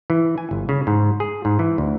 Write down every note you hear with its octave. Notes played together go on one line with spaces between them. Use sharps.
E3
G#5
G1
C#3
G#2
G#4
G#2
E3
D2